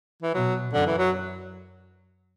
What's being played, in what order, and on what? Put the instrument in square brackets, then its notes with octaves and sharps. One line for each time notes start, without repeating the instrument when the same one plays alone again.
[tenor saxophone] E3
[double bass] B2 [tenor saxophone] F#3
[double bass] F#2 [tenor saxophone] D3
[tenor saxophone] E3
F#3